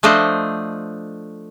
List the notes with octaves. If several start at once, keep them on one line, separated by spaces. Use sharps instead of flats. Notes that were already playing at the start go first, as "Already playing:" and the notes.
F3 A3 D4 C5 D#5